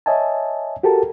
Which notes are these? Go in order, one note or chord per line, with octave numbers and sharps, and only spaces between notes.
C#5 D#5 E5 G#5 A5
F#4 G4 A4 A#4 A5